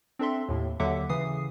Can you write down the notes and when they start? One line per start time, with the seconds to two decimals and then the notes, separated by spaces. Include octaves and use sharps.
0.19 C4 D4 A4 E5 C6
0.49 D#2 A2
0.80 D#2 D3 F#3 E5 F#5 D6
1.09 C#3 E3 D#6 C7